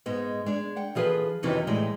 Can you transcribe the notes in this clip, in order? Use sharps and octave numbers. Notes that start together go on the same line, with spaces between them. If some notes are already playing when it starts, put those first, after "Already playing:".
G#2 G#3 B3
G#3 D4
F#5 G5
E3 F3 G#4 A4 B4
F2 C3 D#3 E3 F#3 C#4
A2 E3 G3 G#3